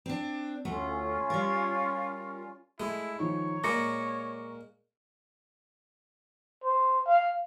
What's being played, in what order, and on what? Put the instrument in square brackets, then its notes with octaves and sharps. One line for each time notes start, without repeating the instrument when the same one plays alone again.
[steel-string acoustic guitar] C4 D4
[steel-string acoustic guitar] D2 A3 [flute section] C#4 F4
[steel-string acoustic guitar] G3 A#4
[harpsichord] G#3 [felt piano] A3 G#4 [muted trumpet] E4
[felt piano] D#3 F3 D#4 [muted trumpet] C#5
[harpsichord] A#2 G#3 [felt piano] A#5 C#6 [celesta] D6 A#6 C#7
[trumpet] C5
F5